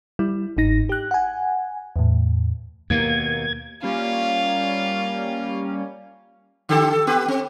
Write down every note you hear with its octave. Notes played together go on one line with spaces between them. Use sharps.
G3 E4
G1 G#2 D#4 A#6
G4 F#6
F#5 G#5
E2 A2
D#2 B2 A#3 G#6
G3 A#3 C#4 F4
D3 G4 A4
A4
B3 G4 B4
C4